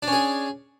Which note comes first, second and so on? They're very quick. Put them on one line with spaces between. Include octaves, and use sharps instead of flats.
D4 C#4 G#4